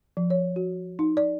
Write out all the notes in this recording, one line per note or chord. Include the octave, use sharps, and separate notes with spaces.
F3
C#5
F#4
D#4
D5